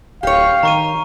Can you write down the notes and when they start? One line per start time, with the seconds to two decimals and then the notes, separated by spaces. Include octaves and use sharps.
0.23 D1 G4 C#5 F5
0.63 D#3 A#5 C#6 D#7